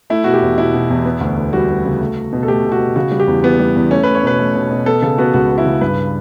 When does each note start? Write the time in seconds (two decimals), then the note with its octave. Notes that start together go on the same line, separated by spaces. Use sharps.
0.10 A3 E4
0.24 B2 F#4
0.34 G4
0.42 E2
0.58 B2 E4
0.74 B2
0.90 E2
1.05 B3
1.21 D2
1.37 D2
1.53 G3 F#4
1.68 G3
1.85 C#3
2.01 A3
2.17 A3
2.33 B2
2.43 A4
2.48 A3 G4
2.64 B2
2.72 F#4
2.80 B2
2.96 C#3 F#4
3.12 G3
3.20 G4
3.27 E2
3.43 E3 B3
3.59 G3
3.75 E2
3.91 A3 C#4
4.03 A3 B4
4.15 C#5
4.23 B2 B4
4.39 A3
4.55 B2
4.71 B2
4.86 B3 A4
5.02 C#3 A4
5.18 B3 F#4
5.34 C#2 F#4
5.50 B3
5.58 E4
5.66 C#3
5.81 G2 B4